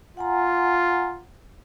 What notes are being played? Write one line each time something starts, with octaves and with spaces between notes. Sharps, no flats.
F4 F#5 G#5 A#5